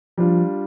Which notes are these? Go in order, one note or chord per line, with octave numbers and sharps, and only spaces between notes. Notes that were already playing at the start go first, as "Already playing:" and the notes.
F3 G3 D4 F4